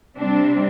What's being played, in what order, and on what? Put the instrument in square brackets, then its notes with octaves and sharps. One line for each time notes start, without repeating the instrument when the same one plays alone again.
[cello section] C3 G3 C4 D4